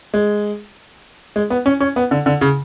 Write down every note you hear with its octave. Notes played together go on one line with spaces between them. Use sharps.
G#3
G#3
B3
C#4
C#4
B3
D3
D3
C#3